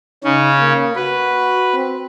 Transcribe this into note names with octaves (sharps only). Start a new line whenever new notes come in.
C#3 C#4 D#4
A#3
F#4 B4
C4